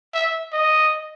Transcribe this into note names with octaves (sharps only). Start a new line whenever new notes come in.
E5
D#5